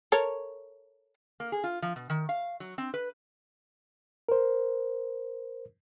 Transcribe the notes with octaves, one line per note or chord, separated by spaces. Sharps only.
A4 A#4 C#5
A#3
G#4
F4
F3
B2
D#3
F5
F#3
C4
B4
A#4 C5